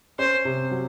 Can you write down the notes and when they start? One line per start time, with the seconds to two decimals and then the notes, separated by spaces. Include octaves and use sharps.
0.19 C#4 C5
0.45 C3
0.71 F#3